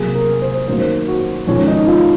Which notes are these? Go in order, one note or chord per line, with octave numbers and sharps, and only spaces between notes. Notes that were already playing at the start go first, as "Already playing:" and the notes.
Already playing: C3 F#3 A#3 G#4
A#4
C5
F#2 D#3 F#3 A#3 C5
F#4
F2 D#3 G#3 C#4
D#4
F4